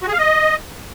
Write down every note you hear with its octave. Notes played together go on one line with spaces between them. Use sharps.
F#4
G#4
F5
D#5